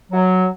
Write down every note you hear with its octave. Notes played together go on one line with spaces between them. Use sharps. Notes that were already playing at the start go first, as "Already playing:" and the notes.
F#3